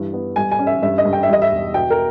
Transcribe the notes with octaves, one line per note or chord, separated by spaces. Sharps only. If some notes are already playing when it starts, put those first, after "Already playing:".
Already playing: G2 E3
B3
G3 G#5
G#5
C#4
E5
G2 E5
D#5
G2
G5
E5
G3 D#5
E5
E1
B2 G5
A#4